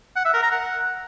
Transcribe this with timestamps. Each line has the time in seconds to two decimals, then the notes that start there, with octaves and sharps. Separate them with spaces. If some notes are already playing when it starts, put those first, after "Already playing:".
0.16 F#5
0.25 E5
0.34 A#4
0.43 A#5
0.52 F#5